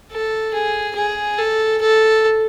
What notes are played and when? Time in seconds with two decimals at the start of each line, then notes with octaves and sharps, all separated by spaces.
0.11 A4
0.54 G#4
0.95 G#4
1.38 A4
1.81 A4